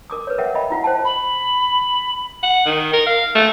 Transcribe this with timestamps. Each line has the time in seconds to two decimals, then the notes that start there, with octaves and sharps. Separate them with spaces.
0.10 A#4 D6 D#6
0.27 B4 C#5
0.38 A#4 E5 F#5 G5
0.54 D#5 E5 G5 B5
0.70 E4 F4 F#5
0.84 C5 G5 A5
1.05 B5
2.43 F#5
2.66 D#3
2.94 A#4
3.06 F5
3.35 A3